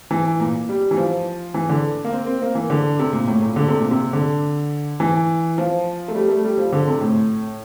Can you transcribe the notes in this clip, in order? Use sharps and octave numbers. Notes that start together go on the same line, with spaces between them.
E3
A#2
G3
E3
F3
E3
D3
A#3
C4
C4
A#3
E3
D3
C3
A#2
A2
A#2
D3
C3
A#2
C3
D3
E3
F3
A3
G3
A3
G3
F3
D3
C3
A2